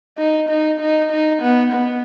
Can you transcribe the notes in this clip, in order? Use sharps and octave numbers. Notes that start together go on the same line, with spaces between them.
D#4
D#4
D#4
D#4
B3
B3